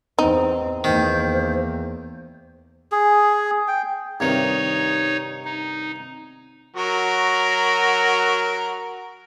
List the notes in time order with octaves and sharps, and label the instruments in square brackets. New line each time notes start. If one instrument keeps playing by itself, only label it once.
[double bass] E2 C4 [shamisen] D#4
[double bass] E2 A#3 [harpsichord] D#3 [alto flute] C5
[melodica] G#4
G5
[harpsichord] G2 C3 D#3 [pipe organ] D#4 C#5
[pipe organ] D#4
[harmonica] F#3 F#4 A#4